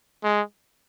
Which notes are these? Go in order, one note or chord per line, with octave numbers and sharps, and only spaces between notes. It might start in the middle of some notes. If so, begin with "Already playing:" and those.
G#3